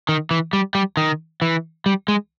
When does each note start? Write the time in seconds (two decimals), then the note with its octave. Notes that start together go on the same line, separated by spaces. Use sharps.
0.09 D#3
0.31 E3
0.53 G3
0.75 G3
0.97 D#3
1.42 E3
1.86 G3
2.08 G#3